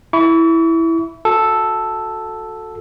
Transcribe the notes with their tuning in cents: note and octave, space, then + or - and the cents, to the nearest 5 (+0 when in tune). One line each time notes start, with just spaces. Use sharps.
E4 +0 C#6 +40
F#4 -20 A4 +0